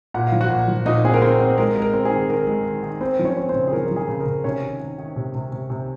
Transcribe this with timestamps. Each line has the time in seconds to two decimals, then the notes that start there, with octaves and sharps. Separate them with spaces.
0.14 A#2 F#5
0.27 F5
0.32 F3
0.41 F#4 F#5
0.50 A#2
0.68 F3
0.86 A#2 D#4 D#5
1.04 C4 G#4
1.14 A#4
1.22 C4 C5
1.40 C4
1.58 G#3 A#4
1.76 G#3
1.82 A#4
1.93 C4
2.05 G#4
2.11 D#3
2.29 D#3 A#4
2.47 G#3
2.65 D#3
2.83 D#3
3.01 C4 C5
3.19 F3
3.25 C#4 C#5
3.37 C4
3.49 C4 C5
3.55 C#3
3.68 G#4
3.73 F3 A#4
3.87 F3 A#4
3.96 G#4
4.08 C#3
4.20 A#4
4.26 C#3
4.44 C3 C#4 C#5
4.63 D#3
4.80 D#3
4.98 D#3
5.16 C3
5.34 C3
5.52 C3
5.70 C3